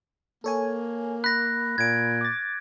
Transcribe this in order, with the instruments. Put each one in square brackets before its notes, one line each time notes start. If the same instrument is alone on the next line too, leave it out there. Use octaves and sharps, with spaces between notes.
[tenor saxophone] A#3 [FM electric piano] A4 C#5 G#5
[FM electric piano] B5 [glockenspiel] F#6 A#6
[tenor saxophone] A#2 [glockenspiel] G#6 D7
[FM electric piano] D6 A6